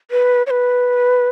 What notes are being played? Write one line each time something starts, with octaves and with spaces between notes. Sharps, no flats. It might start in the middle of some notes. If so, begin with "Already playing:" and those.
B4
C#5
B4